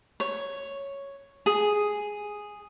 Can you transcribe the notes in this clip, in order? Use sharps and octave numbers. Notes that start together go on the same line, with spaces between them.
C#5
G#4